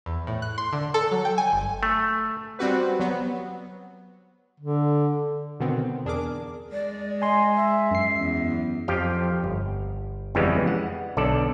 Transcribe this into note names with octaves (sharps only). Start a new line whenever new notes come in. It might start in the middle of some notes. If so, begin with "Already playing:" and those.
E2
A2
F#6
C6
D3
A4
F#3
G5
G#5
G1
A3
G3 C4 F#4 B4
F#3 B3
D3
B2 D3 D#3 B3 C4
E2 D4 G#4 A#4 D6
G#3 D5
D#5 G#5 C6
E5
F#2 C7
E2
F2 F3 G4 F5 G5
G1
F2 C#3 E3 G3 G#3 B3
F#5
B1 D3 A4 D5